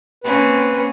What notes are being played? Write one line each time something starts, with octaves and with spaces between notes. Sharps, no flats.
A#3 C4 C#4 B4